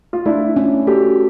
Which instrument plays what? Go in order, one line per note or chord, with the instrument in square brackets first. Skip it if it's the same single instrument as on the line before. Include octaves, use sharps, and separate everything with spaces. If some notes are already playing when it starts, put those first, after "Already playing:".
[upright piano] F4
[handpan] A3 [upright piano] D4 E4
[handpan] C#4
[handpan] F#4 [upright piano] G4 A4